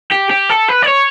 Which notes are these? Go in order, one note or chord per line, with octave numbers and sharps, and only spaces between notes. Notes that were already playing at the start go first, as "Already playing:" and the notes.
G4
G4
A4
B4
D5
C#5